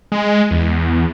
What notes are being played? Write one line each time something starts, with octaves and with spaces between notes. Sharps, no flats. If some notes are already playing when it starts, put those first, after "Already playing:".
G#3
E2